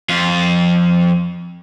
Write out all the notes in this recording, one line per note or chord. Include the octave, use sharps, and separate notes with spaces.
F2 F4